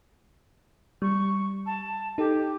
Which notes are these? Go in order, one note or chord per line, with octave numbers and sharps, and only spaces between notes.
G3 C#6
A5
D#4 G4 A4